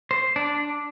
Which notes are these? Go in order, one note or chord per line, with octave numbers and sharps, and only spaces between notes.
C5
D4